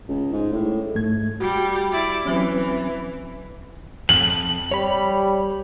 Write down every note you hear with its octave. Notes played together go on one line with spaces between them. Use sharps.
C#2
G#2
A2
G#2 A3 G#6
G3 F#4
E4 D5
E3 F#3 C4 C#4
F2 F#7
G3 C#5 B5